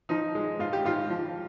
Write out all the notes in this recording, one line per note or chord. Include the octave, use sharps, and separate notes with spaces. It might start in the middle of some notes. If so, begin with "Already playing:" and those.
F3 D#4
G#3
G#2 F4
G4
G#2 F4
F3